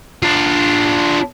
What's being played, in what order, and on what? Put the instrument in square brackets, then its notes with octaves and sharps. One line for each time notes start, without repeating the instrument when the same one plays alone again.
[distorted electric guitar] D4 F4